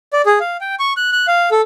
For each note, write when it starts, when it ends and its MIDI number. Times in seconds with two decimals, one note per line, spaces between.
0.13 0.22 74
0.26 0.39 68
0.40 0.57 77
0.61 0.75 79
0.79 0.93 85
0.97 1.11 90
1.13 1.26 90
1.27 1.49 77
1.51 1.62 69